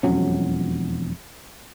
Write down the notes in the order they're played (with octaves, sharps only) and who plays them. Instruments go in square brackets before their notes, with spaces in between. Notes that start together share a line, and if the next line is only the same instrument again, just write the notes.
[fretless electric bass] E1 F2 F#3 C#4